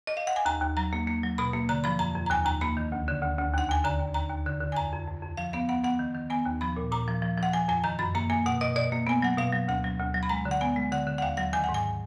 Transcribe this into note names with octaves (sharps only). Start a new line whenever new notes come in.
D#5
F5
F#5
G#5
D#2 A#5
D#2
F#3 A#5
A#3
A#3
F#3
B2 B5
A#3
D3 A#5
F3 B5
F2 A#5
F2
A#5
D#2 G#5
D#2 A#5
A#3 B5
D#3
D2
D3
D2
D2
D#2 F#5
D#2 G#5
D3 A#5
D#2
D#2 A#5
D#2
D3
D3
G#5
F2 A#5
F2
F2
F2
F3 F5
B3 F5
B3 F#5
B3 F#5
D#3
D#3
B3 G#5
D#2
F3 B5
A#2
A#2 A#5
F3
F3
F3 F#5
F3 G#5
F2 G#5
D#3 A#5
F#2 B5
A#3 A#5
A#3 G#5
B2 F#5
B2 D#5
B2 D5
A#3
B3 G#5
F#3 F#5
B2 F5
F#3
D2 F#5
F#3
D2
F#3
B5
G#3 A#5
D3
F#5
B3 G#5
G#3
D3 F#5
D3
F#5
D#2 F5
F#3 F#5
D#3 G#5
G#2 F#5
G#5